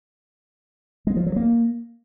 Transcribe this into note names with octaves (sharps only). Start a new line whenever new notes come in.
G#3
F3
F#3
A#3